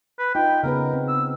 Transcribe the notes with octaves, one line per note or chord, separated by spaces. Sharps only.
B4
D#4 F4 G5
C#3 B3 A#4 B4
C4
E6